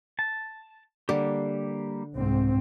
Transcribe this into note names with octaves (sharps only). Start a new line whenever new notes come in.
A5
D3 G3 A#3 G4
C2 G#2 C4